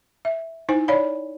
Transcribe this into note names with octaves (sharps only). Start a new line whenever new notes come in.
E5
D#4 E4 C5 G#5
C#5 D5 F5 B5